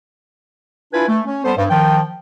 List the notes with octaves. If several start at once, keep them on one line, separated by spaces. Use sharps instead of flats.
D4 E4 F4 B4 G#5
A3
C#4
G3 B3 A4 C5
G2
D#3 F3 G5